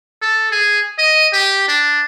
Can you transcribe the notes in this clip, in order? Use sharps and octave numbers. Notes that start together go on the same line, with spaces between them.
A4
G#4
D#5
G4
D4